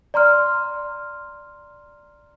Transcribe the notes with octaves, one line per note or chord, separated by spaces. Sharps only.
D5 A#5 C6 F6